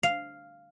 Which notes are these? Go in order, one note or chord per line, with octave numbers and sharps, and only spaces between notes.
F5